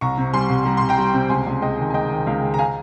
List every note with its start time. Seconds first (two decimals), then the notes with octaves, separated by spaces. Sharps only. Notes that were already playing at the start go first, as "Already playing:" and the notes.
0.01 C2 A#5 C#6
0.18 C3
0.33 G3 G#5 C6
0.49 C2
0.66 G3 A#5
0.77 C2 C6
0.89 G5 A#5
0.98 G3
1.14 C3
1.29 C#2 G#5 C6
1.46 C#2
1.62 G#3 D#5 G5
1.78 D#3
1.90 G#5
1.94 G#3 D#5 G5
2.11 D#3
2.26 C#2 F5
2.42 G#3
2.54 A#5
2.59 F5 G#5